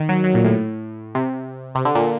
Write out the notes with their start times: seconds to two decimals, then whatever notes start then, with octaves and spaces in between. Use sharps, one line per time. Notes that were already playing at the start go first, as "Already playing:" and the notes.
Already playing: D#3
0.09 F#3
0.24 F#3
0.34 A#2
0.44 A2
1.15 C3
1.75 C3
1.85 D3
1.95 A#2